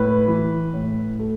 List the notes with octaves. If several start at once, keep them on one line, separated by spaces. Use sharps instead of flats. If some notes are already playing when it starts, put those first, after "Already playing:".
Already playing: A2 B4
E3
A2
A3